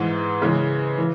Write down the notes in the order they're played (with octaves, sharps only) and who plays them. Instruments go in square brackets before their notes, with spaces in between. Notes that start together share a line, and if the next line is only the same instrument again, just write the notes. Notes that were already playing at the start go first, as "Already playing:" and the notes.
Already playing: [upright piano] G#2 E3 G#3
C#3 E3 G#3
E3